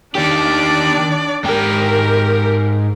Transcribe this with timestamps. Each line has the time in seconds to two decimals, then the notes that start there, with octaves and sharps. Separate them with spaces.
0.15 D#3 D4 G4 D5
1.44 G#2 G4 A#4 G5